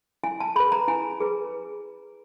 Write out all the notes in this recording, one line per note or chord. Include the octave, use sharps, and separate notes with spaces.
E4 G#5
A5
G#4 B4 B5
A#5
E4 G#5
G#4 B4